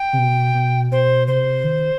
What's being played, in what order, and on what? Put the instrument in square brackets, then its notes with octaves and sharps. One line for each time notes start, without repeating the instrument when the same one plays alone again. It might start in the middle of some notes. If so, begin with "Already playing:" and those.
Already playing: [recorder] G5
[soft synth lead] C3
B2
B2
[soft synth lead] B2 [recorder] C5
[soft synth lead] C3 [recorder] C5
[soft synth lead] D#3